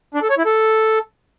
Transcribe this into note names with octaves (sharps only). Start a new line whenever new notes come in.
D4
A4
C#5
E4
A4